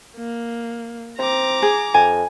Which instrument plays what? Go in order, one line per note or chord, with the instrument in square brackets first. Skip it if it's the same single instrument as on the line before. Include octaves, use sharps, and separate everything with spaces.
[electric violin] A#3
[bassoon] C4 [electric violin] A#5 D6
[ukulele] G#4
[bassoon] F2 [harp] G#5